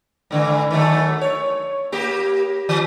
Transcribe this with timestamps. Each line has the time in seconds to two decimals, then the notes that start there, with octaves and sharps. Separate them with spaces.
0.31 G#2 D3 E3
0.71 D#3 F#3 A3
1.21 C#5
1.92 A#3 G4
2.69 E3